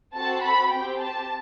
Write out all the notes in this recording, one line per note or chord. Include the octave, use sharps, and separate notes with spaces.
C4 F#4 A4 A5
B5
C4 G4 G5
A5